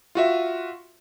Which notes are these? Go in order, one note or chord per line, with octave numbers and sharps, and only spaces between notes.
F4 F#4 E5